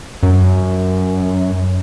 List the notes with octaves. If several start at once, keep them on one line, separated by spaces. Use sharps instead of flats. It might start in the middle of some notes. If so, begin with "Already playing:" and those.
F#2